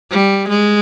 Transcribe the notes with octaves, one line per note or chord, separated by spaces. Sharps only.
G3
G#3